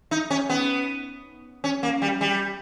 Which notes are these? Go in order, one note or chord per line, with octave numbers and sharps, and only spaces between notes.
D#4
C#4
B3
C#4
A#3
G3
G3